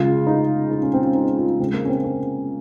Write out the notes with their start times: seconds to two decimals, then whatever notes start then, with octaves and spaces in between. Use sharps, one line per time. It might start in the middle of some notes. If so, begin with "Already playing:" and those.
Already playing: C#3 G#3 F4
0.27 D#4
0.71 D#4
0.83 C#4
0.94 C4
1.04 C#4
1.15 D#4
1.37 F4
1.59 C#3 C4
1.64 G#3
1.74 A#3
1.85 C#4
1.89 C4
2.04 C#4